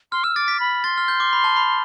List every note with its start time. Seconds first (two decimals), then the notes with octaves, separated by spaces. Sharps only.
0.12 C6 F6
0.24 E6 F6
0.36 D6 A6
0.48 B6
0.60 B5
0.84 C6 A6
0.98 F6
1.08 G6
1.20 D6
1.33 B5
1.44 A5
1.56 B5